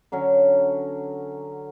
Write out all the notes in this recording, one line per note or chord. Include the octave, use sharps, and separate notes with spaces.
D3 F#3 C#4